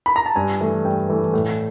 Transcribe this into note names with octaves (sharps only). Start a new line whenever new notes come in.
B5
A#5
A5
G2 G#5
E3 A3
G2 G5
E3 A3
A2